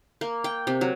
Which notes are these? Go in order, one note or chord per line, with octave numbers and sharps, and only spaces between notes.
A#3
G5
C3
F#3